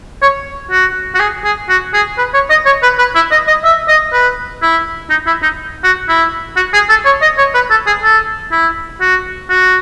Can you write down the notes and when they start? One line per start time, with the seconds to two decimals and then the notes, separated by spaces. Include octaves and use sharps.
0.22 C#5
0.70 F#4
1.14 F#4
1.19 G#4
1.44 G#4
1.69 F#4
1.93 G#4
2.18 B4
2.34 C#5
2.50 D#5
2.65 C#5
2.82 B4
2.98 B4
3.15 E4
3.31 D#5
3.47 D#5
3.64 E5
3.88 D#5
4.12 B4
4.62 E4
5.10 D#4
5.26 E4
5.42 D#4
5.84 F#4
6.08 E4
6.56 F#4
6.73 G#4
6.89 A4
7.05 C#5
7.22 D#5
7.38 C#5
7.54 B4
7.70 A4
7.86 G#4
8.02 A4
8.51 E4
9.00 F#4
9.49 F#4